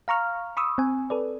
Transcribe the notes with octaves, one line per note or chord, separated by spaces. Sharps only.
F5 A#5 C#6 F6
B5 C#6 D#6 E6
C4 G#5
A4 B4 D5